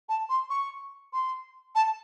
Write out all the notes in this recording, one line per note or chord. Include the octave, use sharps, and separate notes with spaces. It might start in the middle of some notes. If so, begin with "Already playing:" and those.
A5
C6
C#6
C6
A5